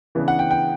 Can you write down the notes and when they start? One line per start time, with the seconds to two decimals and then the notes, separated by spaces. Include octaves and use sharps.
0.15 C#3 E3 B3 D4
0.28 F#5
0.39 G5
0.51 G5